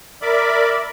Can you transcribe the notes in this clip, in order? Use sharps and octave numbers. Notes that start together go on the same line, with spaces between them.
A#4 D5 E5 B5 D6